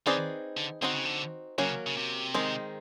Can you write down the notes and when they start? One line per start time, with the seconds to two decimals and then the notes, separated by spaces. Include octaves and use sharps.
0.06 D#3 C4 D#4 G#4 B4 D5
0.57 D3
0.82 D3 C4 D#4 F#4
0.93 C#3
1.05 D3
1.58 C#3 F#3 A#3 C#4 F#4
1.87 C#3
1.97 C3
2.34 D#3 G#3 C4 D#4